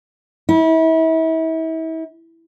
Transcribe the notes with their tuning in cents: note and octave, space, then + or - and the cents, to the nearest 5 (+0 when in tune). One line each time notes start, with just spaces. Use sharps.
E4 -35